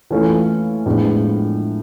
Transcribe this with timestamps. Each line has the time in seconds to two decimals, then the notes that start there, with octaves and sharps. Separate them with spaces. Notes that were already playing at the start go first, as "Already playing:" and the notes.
0.11 E3 A3 C#4 F4 A4
0.86 A2 F3 G#3 B3 D4